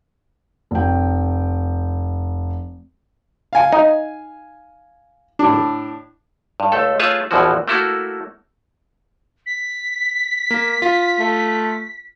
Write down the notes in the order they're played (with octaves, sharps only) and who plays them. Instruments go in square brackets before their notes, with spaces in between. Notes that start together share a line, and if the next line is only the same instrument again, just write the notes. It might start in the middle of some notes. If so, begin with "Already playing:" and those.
[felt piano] F1 G5
[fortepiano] F5 G#5
[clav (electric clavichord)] D#4
[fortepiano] A2 D4
[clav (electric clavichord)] G2
C#2 A3 A4
A3 F4 G#4 B4 C#5 E5
A#1 E2 B2 E3 F3 F#4
A3 A#3 E4 F#4 A4
[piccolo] B6
[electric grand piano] A#3
F4
[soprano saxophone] A3